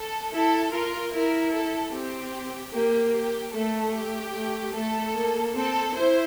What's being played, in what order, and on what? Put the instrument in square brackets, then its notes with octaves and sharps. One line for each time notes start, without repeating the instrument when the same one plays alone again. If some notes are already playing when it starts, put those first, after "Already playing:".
Already playing: [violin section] A4
[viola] E4 [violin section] A4
[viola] F4 [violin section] A#4
[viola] E4 [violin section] A#4
[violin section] A4
[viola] C4 [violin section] G4
[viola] A#3 [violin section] G4
[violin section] G4
[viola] A3 [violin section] A4
[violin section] G4
[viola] A3
[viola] A3 [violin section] A4
[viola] A#3
[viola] C4 [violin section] A4
[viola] E4 [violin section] C5